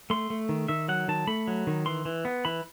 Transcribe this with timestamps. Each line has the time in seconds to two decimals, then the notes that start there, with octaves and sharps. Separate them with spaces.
0.10 A3 C6
0.30 A3
0.49 D#3
0.68 D#3 E5
0.88 F#3 F#5
1.08 D#3 A5
1.27 A3 B5
1.48 F#3
1.67 D#3
1.86 E3 C6
2.05 E3
2.25 B3
2.45 E3 B5